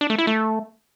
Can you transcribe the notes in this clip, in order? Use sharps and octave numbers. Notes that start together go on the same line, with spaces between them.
D4
A3
E4
A3